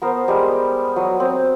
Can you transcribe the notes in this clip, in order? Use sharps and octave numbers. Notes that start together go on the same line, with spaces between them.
B3 A#4 C5
G3 G#3
F#3 D#6
C4